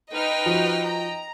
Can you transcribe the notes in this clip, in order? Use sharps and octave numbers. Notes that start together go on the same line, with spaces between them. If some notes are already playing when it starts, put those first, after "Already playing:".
D#4 B4 D#5 G5 F6
F3 F#4
A#5